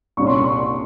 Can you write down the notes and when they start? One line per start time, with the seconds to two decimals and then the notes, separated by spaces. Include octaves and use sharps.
0.17 C2 A#2 G3 C#4 C#6
0.27 C6
0.36 C#6